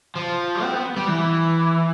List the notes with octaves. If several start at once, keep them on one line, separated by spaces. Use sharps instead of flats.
F3
C4
B3
G3
E3